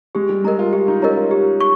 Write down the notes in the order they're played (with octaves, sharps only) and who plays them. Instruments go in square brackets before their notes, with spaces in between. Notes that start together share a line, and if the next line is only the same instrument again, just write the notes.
[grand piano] G#3 [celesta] G4
[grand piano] G3
[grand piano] G#3 [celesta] A#4 D#5 A#5
[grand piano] F4
[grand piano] F4 [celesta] G4
[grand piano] D#4
[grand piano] C#4 [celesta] A#4 D#5 A#5
[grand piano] F4
[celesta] G4
C#6